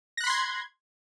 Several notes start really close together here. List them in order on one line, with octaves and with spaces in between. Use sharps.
A#6 F#6 B5 C6 G#6